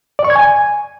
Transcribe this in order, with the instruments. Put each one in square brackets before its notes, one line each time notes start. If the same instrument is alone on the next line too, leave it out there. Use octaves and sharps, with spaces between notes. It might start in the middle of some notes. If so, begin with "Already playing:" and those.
[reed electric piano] D5
C#6
G#6
G#5